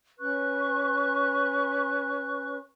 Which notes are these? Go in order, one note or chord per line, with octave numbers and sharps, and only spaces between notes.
C#4 B4 C#6 F#6